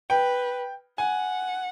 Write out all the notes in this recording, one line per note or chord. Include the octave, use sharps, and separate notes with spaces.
B4 G5
F#5 G#5